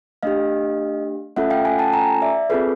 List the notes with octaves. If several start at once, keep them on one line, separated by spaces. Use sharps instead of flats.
A3 D4 G4 D#5 F5
A3 C#4 F4 A4 E5 F#5
F5 G5
F#5 G#5
G5 A5
G#5 A#5
D5 E5
C4 F4 G#4 A4 B4